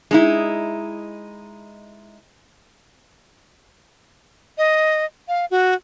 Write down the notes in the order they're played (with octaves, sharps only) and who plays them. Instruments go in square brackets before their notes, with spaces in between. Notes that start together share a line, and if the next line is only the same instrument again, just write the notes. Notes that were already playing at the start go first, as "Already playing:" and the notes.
[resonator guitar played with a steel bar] G#3 D#4 E4
[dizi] D#5
F5
F#4